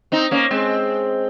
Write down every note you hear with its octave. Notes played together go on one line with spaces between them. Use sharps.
C4 D#4
A#3 C#4
G#3 C4